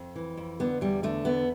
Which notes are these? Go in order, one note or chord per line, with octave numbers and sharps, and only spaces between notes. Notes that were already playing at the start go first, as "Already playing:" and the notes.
Already playing: F2 C4
E3
F2
D3 B3
E2 G3
D3 A3
E2 B3